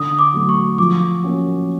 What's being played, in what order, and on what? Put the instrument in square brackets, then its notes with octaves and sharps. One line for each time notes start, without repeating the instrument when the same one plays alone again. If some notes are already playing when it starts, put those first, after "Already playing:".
Already playing: [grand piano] D3 [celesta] D#6
[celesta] D6
[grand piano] F#3 A3
[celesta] C#6
[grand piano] F3 [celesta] D6
[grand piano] A#3 C#4 F#4